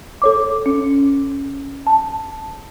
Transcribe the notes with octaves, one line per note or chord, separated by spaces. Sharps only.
A4 C#5 D6
C#4
A5